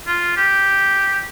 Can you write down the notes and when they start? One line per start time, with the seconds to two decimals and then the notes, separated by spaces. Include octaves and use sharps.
0.07 F4
0.36 G4